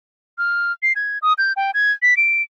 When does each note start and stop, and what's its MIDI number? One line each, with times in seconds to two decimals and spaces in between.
0.38 0.72 89
0.83 0.93 96
0.96 1.18 92
1.22 1.33 87
1.38 1.53 91
1.56 1.71 79
1.74 1.92 92
2.02 2.17 95
2.17 2.42 98